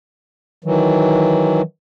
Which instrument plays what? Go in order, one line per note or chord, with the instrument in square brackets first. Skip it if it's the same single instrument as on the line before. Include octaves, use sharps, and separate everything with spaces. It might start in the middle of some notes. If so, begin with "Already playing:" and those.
[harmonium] D#3 E3 F#3